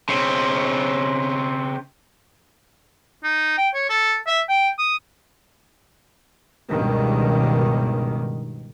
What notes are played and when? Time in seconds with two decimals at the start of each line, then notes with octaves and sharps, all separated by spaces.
0.09 C#3 C4
3.24 D#4
3.58 G5
3.74 C#5
3.90 A4
4.27 E5
4.49 G5
4.78 D#6
6.69 C#2 G2 B2 D#3